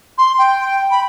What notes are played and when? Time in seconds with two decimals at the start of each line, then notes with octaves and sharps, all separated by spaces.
0.18 C6
0.39 G5
0.90 B5